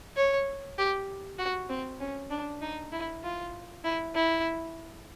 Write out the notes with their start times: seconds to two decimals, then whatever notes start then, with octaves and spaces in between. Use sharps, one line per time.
0.17 C#5
0.78 G4
1.39 F#4
1.69 C4
2.00 C#4
2.30 D4
2.61 D#4
2.92 E4
3.24 F4
3.84 E4
4.15 E4